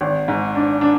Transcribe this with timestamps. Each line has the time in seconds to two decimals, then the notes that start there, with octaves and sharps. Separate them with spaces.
0.01 G#1
0.28 G#2
0.55 D4
0.81 D4